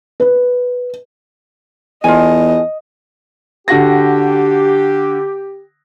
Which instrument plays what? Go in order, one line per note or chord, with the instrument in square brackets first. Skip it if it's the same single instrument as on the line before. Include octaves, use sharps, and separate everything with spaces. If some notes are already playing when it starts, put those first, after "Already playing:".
[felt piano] B4
[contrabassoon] E2 [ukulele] F4 A4 G#5 [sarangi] D#5
[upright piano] D3 F#4 A#6 [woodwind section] G4